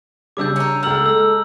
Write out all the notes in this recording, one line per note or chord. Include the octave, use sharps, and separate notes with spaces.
C#3 G3 D4 D6 E6 G6
C#4 A#4
C#2 A4 A#5 E6 F6 F#7
G#3 E6 F6